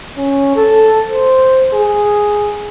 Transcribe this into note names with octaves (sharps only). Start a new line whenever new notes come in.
C#4
A4
C5
G#4